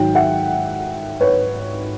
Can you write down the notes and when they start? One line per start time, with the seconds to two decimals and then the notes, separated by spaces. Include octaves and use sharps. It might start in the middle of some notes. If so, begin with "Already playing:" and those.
Already playing: G#2 D#3 F#3 G5
0.15 E5 F#5
1.20 B4 C#5